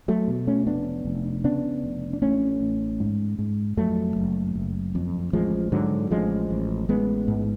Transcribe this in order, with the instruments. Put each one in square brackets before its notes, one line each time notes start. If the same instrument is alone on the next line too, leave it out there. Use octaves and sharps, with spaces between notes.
[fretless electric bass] F#3 A3
B2
A3 C#4
F1 B3 D4
F1
C#3 B3 D4
F1
D4
A1 A3 C#4
A1
G#2
G#2
F2 F#3 A3
F#1
F#1
F2
A1 F3 G#3
G#2 D3 F#3
A1 F3 G#3
A1
A1 G#3 B3
G#2